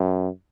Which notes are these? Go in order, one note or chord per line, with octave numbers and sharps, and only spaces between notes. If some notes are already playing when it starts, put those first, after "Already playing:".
Already playing: F#2